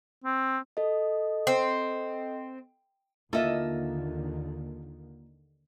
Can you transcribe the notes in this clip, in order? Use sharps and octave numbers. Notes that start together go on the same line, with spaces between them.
C4
A4 D#5
C4
D#2 D3 D#3 A#3 F4 A4 D#5 E5